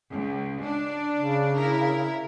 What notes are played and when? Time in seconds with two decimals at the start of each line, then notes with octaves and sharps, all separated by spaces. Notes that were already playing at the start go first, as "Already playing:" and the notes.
0.12 C#2
0.64 D4
1.14 C#3
1.56 E4 A#4